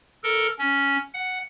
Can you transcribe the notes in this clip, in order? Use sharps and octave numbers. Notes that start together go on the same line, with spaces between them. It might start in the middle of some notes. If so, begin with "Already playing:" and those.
A4 A#4
C#4
F#5